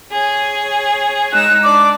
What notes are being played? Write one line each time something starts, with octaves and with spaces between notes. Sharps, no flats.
G#4 C#5
G#3 D#4 E6 F#6
D4 D5 D6